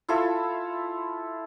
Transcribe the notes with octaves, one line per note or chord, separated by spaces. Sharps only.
E4 F4 A4 E5